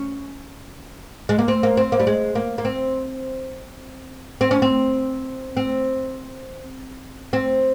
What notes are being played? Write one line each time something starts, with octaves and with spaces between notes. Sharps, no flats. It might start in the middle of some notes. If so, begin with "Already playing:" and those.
Already playing: C#4
G#3
A#3
C4
A#3
C4
A#3
G3
G#3
A#3
A#3
C4
C4
C#4
C4
C4
C4